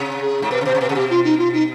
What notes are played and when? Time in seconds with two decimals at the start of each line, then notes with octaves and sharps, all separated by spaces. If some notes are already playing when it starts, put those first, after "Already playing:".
Already playing: C3
0.22 G#4
0.42 G#2
0.51 B2 B4
0.61 C3
0.65 B2 C5
0.75 C3
0.81 B2 B4
0.89 C3 G#4
0.95 B2 G4
1.10 F4
1.25 D#4
1.38 F4
1.53 D#4